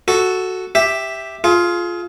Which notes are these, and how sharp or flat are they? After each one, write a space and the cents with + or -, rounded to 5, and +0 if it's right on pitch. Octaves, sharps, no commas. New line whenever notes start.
F#4 +0 A4 +0
G4 +0 E5 +0
F4 +0 G#4 +35